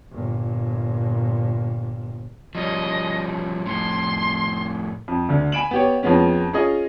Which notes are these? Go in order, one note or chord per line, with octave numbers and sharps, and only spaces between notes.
G1 A#2
F3 G3 C#4 D#5
F2 A2 C6
F2
D2 D3
G#5 B5 D7 E7 F#7
B3 G4 C#5
F2 F3 G#3 B3 C#4
C#4 F4 G#4 D#5